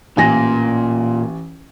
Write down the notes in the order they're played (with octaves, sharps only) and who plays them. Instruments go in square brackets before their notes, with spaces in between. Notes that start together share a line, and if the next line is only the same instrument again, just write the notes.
[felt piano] A1 G#5 A#6 [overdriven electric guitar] A#2